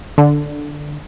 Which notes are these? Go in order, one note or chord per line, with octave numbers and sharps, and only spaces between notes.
D3